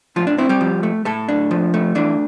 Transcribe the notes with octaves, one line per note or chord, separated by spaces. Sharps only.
A2 F3 F4
D4
C4 E4
G3 G4
F3
A3
A2 A3 A4
D4
F3
A3
E3 D4